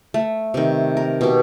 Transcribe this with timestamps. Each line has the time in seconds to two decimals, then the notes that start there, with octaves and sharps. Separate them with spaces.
0.14 A3
0.54 C3 D#3
0.97 A#4
1.21 B2 G4